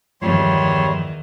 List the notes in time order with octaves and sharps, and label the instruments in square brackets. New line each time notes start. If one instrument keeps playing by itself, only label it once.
[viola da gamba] E2 D#3 [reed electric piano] G2 F3 [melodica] G3 C#5 C6